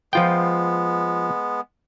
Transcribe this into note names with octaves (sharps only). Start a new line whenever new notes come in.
F3 G#3 B3 F4 G5